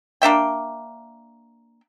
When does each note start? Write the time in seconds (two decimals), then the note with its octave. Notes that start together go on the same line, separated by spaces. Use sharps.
0.22 A#3 D4 E5 G5